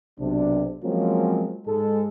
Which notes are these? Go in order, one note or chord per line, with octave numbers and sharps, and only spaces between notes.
B1 C3 D4
F3 F#3 G#3 A#3 C4 C#4
G#2 G#3 A4